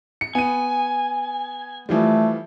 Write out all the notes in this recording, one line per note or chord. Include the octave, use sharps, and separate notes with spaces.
C#7
B3 G#5 D#7
E3 F3 G3 A3